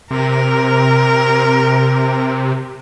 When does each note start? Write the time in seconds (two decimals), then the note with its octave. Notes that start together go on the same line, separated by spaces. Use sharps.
0.11 C3 A#4